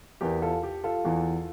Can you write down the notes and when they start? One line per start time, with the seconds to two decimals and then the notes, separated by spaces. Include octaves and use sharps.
0.21 E2 E3 G4 A#4
0.42 F4 A4
0.63 G4
0.84 F4 A4
1.05 E2 E3